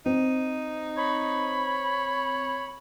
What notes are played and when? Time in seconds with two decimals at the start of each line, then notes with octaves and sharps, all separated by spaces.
0.06 C4 D#4
0.97 C#5 B5